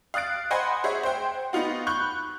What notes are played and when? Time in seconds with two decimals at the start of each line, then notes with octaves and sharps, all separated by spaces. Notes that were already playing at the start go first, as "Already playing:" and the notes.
0.14 F5 D#6 F#6 A6 D7
0.51 C5 D#5 F#5 G#5 B5 C6
0.84 G#4 C5 C#5 E5 F#5
1.03 C5 G5
1.53 B3 D#4 F4 F#4
1.87 B5 C#6 F#6 G6